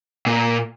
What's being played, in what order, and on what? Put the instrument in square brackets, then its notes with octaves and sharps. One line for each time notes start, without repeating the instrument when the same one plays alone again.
[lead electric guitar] A#2